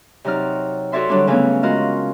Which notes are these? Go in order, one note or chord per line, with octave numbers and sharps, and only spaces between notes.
C3 F#3 D#4 D5 F6
F#4 A4 C#5 D5 E5 C6
D3 F#3 G3 D4 E4
C#3 E3 F#3 A3 B3 C#4
G#3 F4 F#4 A#4 D#5